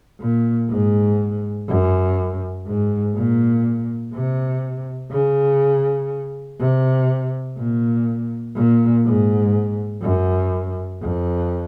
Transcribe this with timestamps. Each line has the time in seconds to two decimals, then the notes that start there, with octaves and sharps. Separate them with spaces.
0.20 A#2
0.69 G#2
1.68 F#2
2.66 G#2
3.15 A#2
4.14 C3
5.12 C#3
6.59 C3
7.58 A#2
8.55 A#2
9.05 G#2
10.02 F#2
11.02 F2